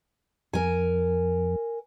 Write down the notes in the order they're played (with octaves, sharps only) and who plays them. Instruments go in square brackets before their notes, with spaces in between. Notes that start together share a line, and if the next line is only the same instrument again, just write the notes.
[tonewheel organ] F2 [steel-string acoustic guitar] A#4 G#5